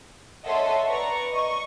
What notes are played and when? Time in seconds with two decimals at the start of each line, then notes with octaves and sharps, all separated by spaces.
0.47 A4 C#5 D#5 E5 F#5 C6
0.87 B4 D5 A#5 C#6
1.32 D#5 C#6